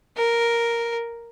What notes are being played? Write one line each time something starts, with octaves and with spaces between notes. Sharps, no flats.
A#4